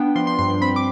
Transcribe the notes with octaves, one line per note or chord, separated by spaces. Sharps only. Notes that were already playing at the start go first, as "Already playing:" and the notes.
Already playing: B3 D4 G5
F3 C6
C6
G2 C6
C6
C4 B5
D6